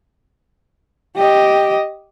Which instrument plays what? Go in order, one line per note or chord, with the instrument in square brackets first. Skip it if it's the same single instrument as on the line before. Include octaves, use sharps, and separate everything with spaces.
[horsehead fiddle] G4 D#5